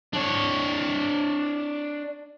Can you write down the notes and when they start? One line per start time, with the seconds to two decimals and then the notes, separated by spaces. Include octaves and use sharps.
0.13 D4 C#5